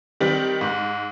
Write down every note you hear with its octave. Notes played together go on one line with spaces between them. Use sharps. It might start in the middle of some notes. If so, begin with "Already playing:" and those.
D#3 G3 C4 G4
G#2